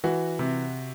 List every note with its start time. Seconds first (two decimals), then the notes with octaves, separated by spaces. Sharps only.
0.04 E3 F#4
0.39 C3